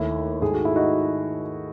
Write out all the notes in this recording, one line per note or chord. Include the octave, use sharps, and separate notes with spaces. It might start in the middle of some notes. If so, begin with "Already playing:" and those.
Already playing: D#2 D#3 A3 E4
G#2 D#3 A3 G#4
F#4
E4
D#4 F#4